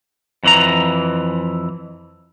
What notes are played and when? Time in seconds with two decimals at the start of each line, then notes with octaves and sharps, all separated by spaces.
0.43 F2 E3 A#5